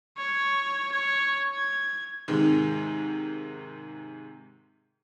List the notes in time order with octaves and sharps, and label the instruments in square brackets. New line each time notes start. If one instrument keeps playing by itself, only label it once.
[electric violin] C#5
C#5
G#6
[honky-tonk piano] G#2 C3 D#3 G#3